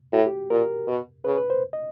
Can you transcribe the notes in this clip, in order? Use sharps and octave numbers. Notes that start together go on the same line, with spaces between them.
A2 F#4
G4
A#2 A#4
B2
C#3 B4
B4
C5
D#5